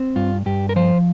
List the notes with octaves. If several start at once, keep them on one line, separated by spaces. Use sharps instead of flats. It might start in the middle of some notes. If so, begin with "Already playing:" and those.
Already playing: C4
G2 F4
G2 G4
A#4
F3 C5